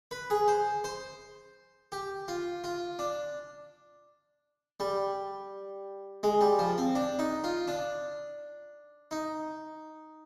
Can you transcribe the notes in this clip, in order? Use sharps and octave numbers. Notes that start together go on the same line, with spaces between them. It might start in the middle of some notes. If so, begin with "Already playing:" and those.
B4
G#4
C5
C5
G4
F4
F4
D4
G3
G#3
G3
F3
C4
D4
D#4
F4
D4
D#4